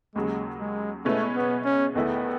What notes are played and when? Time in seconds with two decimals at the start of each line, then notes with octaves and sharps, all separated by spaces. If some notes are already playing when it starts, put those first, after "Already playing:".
0.15 D#2 C#3 F#3 G#3
0.60 G#3
1.05 B2 G#3 A3 C#4 E4 B4
1.36 B3
1.65 C#4
1.95 E2 D#3 A3 B3 E4